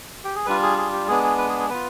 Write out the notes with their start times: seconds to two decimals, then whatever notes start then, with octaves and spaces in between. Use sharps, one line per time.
0.24 G4
0.35 G#4
0.46 G3 D4 F4 B4
0.63 G#4
0.77 G#4
0.93 G4
1.08 G#3 B3 D4 G#4
1.23 G#4
1.38 B4
1.49 G#4
1.60 G#4
1.69 B3 F4 B4